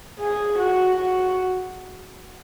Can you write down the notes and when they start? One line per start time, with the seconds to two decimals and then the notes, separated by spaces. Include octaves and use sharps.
0.19 G#4
0.58 F#4
0.97 F#4